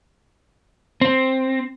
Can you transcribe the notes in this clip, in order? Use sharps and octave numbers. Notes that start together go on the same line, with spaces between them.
C4